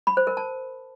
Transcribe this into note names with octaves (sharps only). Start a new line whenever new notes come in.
B5
C5
A#4
A5